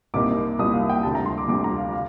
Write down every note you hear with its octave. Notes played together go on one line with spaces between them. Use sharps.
C2 C3 G3 A#3 D#4 D6
C2 C3 G3 A#3 D#4 D#6
F5
G5
D2 C3 G3 A5
A#5
C6
D6
D2 C3 G3 D6
A#5
F5
F5